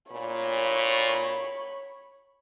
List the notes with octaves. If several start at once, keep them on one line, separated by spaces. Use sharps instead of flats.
A#2 C#5 B5